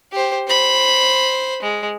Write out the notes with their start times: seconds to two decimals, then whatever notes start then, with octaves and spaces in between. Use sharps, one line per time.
0.12 G4 C5
0.48 C5 B5
1.62 G#3